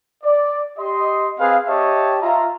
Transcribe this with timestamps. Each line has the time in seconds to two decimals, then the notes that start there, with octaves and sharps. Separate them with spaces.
0.24 D5
0.78 G4 D#5 C6
1.39 C4 G#4 B4 F5
1.67 G4 C#5 D#5 E5 G5 A5
2.22 F4 E5 A#5